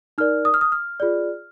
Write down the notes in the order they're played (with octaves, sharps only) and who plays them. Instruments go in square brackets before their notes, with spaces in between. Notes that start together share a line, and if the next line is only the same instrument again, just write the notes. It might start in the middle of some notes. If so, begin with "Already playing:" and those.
[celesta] D#4 A#4 D5 F6
D#6
F6
D#6
F6
F4 G#4 D5